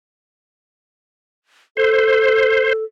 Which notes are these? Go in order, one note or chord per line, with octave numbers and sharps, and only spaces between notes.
A4 C5